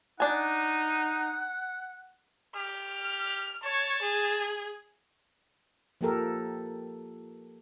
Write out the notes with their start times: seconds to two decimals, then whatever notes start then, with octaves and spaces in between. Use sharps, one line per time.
0.20 D4 D#4 F#5 G#5
2.56 G4 F6
3.63 C#5 A5
4.02 G#4
6.01 F3 A#3 G4 A4 A#4